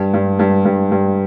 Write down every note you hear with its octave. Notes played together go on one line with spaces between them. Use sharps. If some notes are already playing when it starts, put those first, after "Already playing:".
Already playing: G2
G2
G2
G2
G2